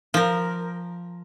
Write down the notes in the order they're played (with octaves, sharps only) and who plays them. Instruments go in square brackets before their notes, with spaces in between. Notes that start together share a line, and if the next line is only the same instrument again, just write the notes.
[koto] F3 A#4